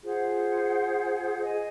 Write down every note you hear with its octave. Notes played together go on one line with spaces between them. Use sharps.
F4 G#4 C5 F#5
G#4 D#5 G#5